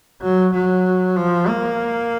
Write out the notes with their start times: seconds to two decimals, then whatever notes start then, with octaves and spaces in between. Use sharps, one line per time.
0.22 F#3
0.53 F#3
1.17 F3
1.48 A#3